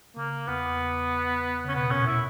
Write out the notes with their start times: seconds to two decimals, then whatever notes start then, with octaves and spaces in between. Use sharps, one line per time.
0.17 C#3 A#3
0.48 E2 B3
1.65 C#3 C#4
1.75 B2 B3
1.91 A#2 C#4
2.06 E4